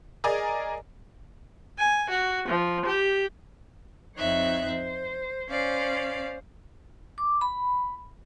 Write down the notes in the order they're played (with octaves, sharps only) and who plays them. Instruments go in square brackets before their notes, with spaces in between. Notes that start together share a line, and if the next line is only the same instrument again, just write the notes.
[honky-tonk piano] G#4 A#4 D5 D#5 G#5 A#5
[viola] G#5
F#4
F3
G4
[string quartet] F2 C4 D#4 C#5 E5 F#6
C5
C#4 C5 D5 F5
[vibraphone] D6
B5